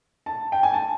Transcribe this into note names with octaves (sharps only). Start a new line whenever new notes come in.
A5
G5
G#5
A5